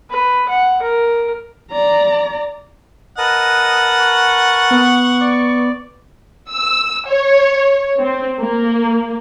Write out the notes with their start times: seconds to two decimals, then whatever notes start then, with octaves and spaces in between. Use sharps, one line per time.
0.11 B4
0.49 F#5
0.82 A#4
1.71 D5 A#5
3.18 A#4 B4 D#5 F#5 A5
4.01 C#6
4.71 B3
5.21 D5
6.50 E6
7.08 C#5
7.97 C4
8.40 A#3